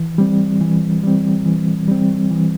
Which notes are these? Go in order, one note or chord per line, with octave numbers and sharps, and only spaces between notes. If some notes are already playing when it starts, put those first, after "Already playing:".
Already playing: E3
G3 C4
E3
G3 C4
E3
G3 C4
E3